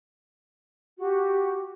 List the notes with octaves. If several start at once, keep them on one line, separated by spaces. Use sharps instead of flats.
F#4 G4